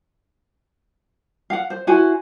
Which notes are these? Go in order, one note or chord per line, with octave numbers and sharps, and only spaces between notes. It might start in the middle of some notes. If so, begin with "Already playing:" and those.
F5 F#5
C5
E4 F#4 C5 G#5